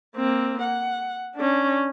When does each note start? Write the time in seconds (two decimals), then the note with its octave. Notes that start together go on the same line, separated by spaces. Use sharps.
0.17 A#3 C4
0.62 F#5
1.36 C#4 D4